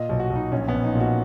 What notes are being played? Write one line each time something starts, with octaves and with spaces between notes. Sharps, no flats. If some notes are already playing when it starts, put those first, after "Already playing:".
Already playing: A#2 D#5
B1
F#4
B1
D#4
A#1 C#4
B3
A#1
D#4
A#2
F#4